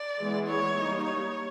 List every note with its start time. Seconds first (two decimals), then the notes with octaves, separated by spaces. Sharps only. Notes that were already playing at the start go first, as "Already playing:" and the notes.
Already playing: D5
0.19 E3 G#3 B3 E4 G#4
0.47 C#5
0.75 G3 A#3 D#4
1.04 C#5